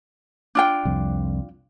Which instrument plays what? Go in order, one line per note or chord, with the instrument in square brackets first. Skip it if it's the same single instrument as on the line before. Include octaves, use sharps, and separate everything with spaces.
[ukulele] D4 F4 G5
[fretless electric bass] C2 F2